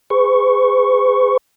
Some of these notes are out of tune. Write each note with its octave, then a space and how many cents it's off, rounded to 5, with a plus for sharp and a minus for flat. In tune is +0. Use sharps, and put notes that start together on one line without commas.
G#4 -15 B4 +45 C#6 +0